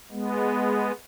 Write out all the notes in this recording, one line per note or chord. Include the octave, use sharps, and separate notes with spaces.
G#3 B3